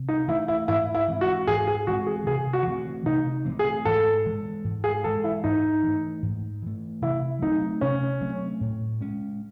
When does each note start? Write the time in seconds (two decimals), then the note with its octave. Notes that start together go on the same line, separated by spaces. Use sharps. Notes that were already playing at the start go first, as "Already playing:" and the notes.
Already playing: C3
0.09 D#4
0.28 E3 A3 E4
0.48 E4
0.68 G#2 E4
0.95 E4
1.08 E3 G#3 C4
1.21 F#4
1.47 G#2 G#4
1.67 G#4
1.87 E3 G#3 C4 F#4
2.07 G#4
2.26 C3 G#4
2.53 F#4
2.67 E3 A3 C4
3.06 C3 D#4
3.46 E3 A3 C4
3.59 G#4
3.85 G#2 A4
4.26 E3 G#3
4.64 G#2
4.84 G#4
5.04 E3 G#3 A4
5.24 E4
5.44 G#2 D#4
5.83 E3 A3
6.23 G#2
6.62 E3 A3
7.02 C3 E4
7.42 F#3 A3 C4 D#4
7.81 C3 C#4
8.21 F#3 A3 C4
8.61 A2
9.01 G#3 C#4